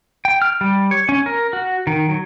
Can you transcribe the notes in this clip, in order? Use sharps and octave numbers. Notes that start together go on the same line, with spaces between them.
G5
F6
G3
C#5
C#4
A#4
F#4
D#3
F#3